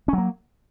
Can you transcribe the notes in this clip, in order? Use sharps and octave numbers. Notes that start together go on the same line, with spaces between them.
F#3 A#3 C#4